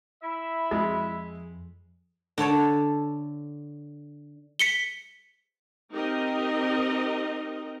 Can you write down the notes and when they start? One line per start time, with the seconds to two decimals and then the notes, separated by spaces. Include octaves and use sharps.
0.23 E4 E5 B5
0.71 F2 G#3
2.38 D3 A4 C#5 A5
4.59 B6 C#7 G7
5.92 C4 D#4 G4 A#4 D#5